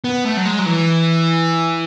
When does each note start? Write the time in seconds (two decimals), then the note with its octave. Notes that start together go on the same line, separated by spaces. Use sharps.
0.04 B3
0.25 A3
0.37 F#3
0.46 G#3
0.59 F#3
0.66 E3